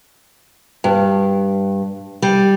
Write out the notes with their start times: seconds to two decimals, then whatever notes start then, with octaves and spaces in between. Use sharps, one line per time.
0.84 G2
2.22 G3